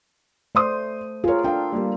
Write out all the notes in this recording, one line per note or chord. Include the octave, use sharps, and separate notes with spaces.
A3 C5 D5 C6 D#6
F4 G#4 A#4 C#5
D4 A4 F5 G5
G3 A#3 G4